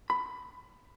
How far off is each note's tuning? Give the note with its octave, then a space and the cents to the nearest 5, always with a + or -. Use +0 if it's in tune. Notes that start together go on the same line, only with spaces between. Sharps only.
B5 +15